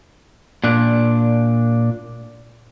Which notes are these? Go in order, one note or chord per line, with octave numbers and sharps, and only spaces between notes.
A#2 D4